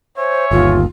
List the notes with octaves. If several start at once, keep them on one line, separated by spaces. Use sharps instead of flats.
C5 C#5 E5 G#5
G1 D#2 F4